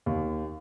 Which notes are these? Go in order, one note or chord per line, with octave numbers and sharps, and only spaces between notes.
D#2